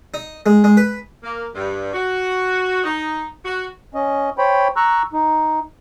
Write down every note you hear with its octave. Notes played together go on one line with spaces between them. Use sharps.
D#4
G#3
G#3
B4
A#3
G2
F#4
D#4
F#4
C#4 D#5
C5 C#5 G5 B5
A#5 C#6 E6 F#6
D#4